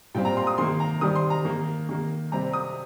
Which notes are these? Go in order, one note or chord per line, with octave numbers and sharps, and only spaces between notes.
A#2 G3 C4 G5
A#5
C6
D#6
D#3 A#3 C6
A#5
D#3 G3 C4 D#6
C6
A#5
D#3 A#3
D#3 A#3
C3 G3 C4 A#5
D#6